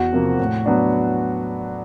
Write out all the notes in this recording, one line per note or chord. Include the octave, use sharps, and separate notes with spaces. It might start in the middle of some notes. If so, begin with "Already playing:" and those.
Already playing: E2 F#4
C3 F3 A#3
A2
F#3 B3 D4